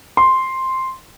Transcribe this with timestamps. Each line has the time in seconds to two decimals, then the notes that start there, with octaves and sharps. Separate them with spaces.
0.17 C6